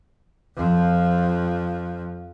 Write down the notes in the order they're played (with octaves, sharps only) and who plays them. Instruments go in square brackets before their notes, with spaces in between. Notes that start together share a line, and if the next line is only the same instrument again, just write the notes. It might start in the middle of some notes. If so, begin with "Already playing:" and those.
[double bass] F2 F3